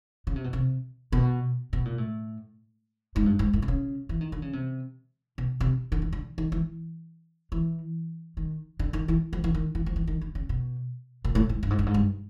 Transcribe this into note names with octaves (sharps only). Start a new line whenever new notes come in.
C#3
C3
B2
C3
B2
B2
A#2
A2
G#2
G2
G#2
A2
C3
C#3
E3
D#3
D3
C#3
C3
B2
C3
D3
E3
D3
D#3
E3
E3
D#3
D3
D#3
E3
F3
E3
D#3
E3
F3
E3
D#3
D3
C#3
B2
A#2
A2
G#2
G2
G#2
G2
G#2
G2